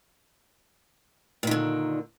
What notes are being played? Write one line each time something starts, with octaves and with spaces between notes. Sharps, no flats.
A#2 D3 D#3